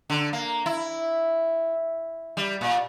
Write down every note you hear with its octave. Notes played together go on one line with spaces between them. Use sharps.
D3
A#3
E4
G3
A#2